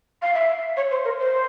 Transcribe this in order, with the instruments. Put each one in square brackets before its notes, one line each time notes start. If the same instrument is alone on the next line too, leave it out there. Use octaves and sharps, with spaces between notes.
[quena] F5
E5
C#5
C5
A#4
C5